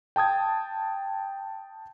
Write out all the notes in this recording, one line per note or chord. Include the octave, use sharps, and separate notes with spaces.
G5 A5 D#6 G#6